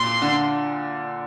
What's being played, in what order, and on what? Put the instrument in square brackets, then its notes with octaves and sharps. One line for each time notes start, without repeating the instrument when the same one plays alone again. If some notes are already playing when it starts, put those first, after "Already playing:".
Already playing: [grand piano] A#2 [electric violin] C6
[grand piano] D3